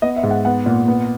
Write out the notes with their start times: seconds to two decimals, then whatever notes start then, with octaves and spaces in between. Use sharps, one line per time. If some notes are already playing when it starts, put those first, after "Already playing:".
0.02 B3 D#5
0.16 E5
0.23 G#2
0.31 F#5
0.45 B3 F#5
0.66 A#2
0.88 B3